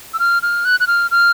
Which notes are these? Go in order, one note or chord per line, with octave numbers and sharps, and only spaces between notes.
E6
F6
F6
F#6
F#6
F6
F6